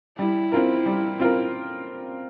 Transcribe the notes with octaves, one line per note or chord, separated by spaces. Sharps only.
G3 E4
C4 F4 A#4
G3
C4 F4 A#4